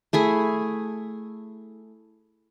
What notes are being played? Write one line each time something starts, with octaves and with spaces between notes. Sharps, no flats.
A3 E4 G#4